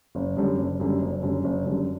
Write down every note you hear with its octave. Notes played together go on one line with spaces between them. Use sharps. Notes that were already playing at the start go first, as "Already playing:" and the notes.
F#1
F#2 D3 G3
F#1
F#2 D3 G3
F#1
F#2 D3 G3
F#1
F#2 D3 G3